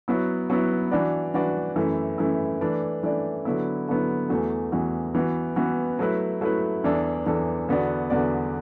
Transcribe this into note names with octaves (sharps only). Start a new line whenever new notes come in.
F#3 B3 E4
F#3 B3 E4
E3 D4 F#4 B4 D5
E3 D4 F#4 B4 D5
F#2 E3 A3 E4
F#2 E3 A3 E4
E3 A3 D4 B4 D5
E3 A3 D4 B4 D5
D3 F#3 B3 E4
D3 F#3 B3 E4
E2 E3 A3 F#4
E2 E3 A3 F#4
E3 B3 F#4
E3 B3 F#4
F#3 A3 E4 B4
F#3 A3 E4 B4
E2 E3 D4 A4
E2 E3 D4 A4
E2 D3 B3 F#4 D5
E2 D3 B3 F#4 D5